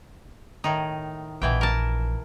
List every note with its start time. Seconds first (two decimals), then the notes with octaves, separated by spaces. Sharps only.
0.64 A2 D#3 D#4
1.42 A#1 B2 E3 G5
1.61 A#4 A5